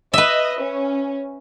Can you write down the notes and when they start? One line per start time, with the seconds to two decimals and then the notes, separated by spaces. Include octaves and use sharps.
0.14 B4 D#5 E5
0.62 C#4